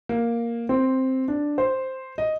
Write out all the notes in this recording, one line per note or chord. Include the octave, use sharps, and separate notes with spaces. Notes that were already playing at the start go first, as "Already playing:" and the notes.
A#3
C4
D4
C5
D#5